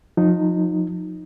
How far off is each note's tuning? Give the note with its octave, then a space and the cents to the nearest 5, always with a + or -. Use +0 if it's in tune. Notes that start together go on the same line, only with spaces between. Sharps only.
F3 +40 D#4 +0